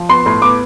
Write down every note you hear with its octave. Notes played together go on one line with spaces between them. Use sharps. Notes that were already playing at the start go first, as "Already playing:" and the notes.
Already playing: F3
B3 C6
A2
B3 D6